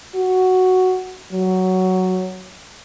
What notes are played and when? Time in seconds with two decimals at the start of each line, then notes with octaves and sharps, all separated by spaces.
0.15 F#4
1.32 F#3